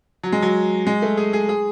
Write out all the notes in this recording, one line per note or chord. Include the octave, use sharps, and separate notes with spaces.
F#3
G#3
F#3
G#3
A3
G#4
G#4
G#4